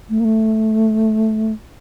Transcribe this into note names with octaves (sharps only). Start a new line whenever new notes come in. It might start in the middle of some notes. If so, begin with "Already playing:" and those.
A3
A#3
A3